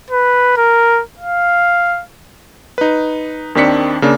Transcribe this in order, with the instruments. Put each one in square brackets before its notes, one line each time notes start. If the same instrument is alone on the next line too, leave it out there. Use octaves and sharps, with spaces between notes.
[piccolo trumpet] B4
A#4
F5
[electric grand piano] D#4 B4
D#2 D#3 C4 D4 B6 C#7
C#3 A#3 D4